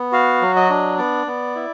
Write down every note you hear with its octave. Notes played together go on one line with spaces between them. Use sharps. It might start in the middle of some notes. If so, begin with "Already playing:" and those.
Already playing: B3
F#4 F5
F#3
D#5
D4
B3 D5
B3
E4